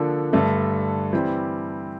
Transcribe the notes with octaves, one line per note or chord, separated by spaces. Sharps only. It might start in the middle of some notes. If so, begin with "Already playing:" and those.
Already playing: D3 F3 A#3 D4 A4
G2 D3 A3
E3 G3 C4 E4 G4